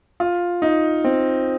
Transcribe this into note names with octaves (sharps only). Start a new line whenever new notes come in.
F4
D#4
C4